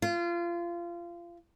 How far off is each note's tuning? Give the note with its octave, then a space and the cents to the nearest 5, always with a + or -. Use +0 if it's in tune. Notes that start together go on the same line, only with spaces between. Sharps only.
F4 -25